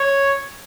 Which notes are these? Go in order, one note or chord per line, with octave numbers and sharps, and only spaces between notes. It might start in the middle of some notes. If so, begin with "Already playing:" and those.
Already playing: C#5